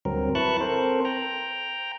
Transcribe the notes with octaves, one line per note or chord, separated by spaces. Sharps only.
D2 G2 F#3 C4 A#4
E4 B4 A5 C#6 F#6
C4 A4 A#4 C5
G5 A#5